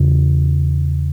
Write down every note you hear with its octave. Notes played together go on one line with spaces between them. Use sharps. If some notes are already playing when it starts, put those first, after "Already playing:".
Already playing: E2 C#3